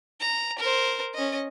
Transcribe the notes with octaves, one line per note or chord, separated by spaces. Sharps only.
A#5
A#4 C5
C#4 D#5